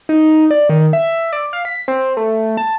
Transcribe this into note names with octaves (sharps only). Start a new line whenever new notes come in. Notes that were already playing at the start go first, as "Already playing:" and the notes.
D#4
D5
D#3
E5
D5
F5
B6
C4
A3
A5